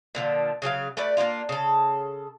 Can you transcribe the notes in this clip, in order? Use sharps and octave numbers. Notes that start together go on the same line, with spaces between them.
A#2 D3 F3
C#3 F#3 G#4 F5
A3 F#4 B4 D5
A#3 C4 D4 F4
C#3 A4